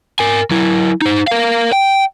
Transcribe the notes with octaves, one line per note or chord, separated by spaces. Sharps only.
A#4 G#5
F#3 E4
D#4 C5
A#4 F5
G5